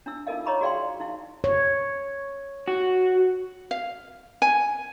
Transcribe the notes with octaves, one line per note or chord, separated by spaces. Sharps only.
D4 E4 E6
D#4 F4 A4 A#4 D#5 F5
C#5 D#5 A#5 B5 C#6 D6
F#4 G#4 D5 F5 G5 C6
D#4 E4 F5
C#5
F#4
F5
G#5